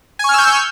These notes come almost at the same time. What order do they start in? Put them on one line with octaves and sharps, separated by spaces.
G#5 C#6 F6 E6 G6